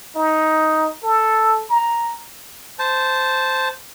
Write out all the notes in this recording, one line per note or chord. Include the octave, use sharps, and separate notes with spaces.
D#4
A4
A#5
C5 A5